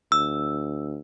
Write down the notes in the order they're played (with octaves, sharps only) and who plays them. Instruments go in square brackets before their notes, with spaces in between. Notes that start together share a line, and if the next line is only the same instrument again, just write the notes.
[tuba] D2 [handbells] E6